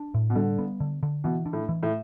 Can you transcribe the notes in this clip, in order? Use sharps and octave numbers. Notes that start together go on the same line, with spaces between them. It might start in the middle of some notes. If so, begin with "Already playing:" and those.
Already playing: D4
A2
B2
D3 G3
B3
D3
D3
B2 E3
D4
A2
E3
A2